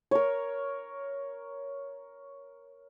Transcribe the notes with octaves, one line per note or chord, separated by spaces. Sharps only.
A#4 C#5